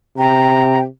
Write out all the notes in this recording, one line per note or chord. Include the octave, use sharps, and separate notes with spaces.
C3 G5 A#5